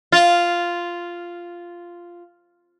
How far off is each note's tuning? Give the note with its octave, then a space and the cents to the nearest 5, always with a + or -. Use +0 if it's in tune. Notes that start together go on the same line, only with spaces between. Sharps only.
F4 -5